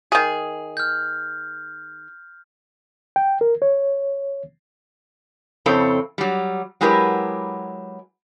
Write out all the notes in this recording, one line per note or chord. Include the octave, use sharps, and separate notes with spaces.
D#3 G#4
F6 G6
G5
A#4
C#5
F2 C#3 C4 E4 A4 C#5
F#3 G3
F#3 G#3 E4 G4 A#4 B4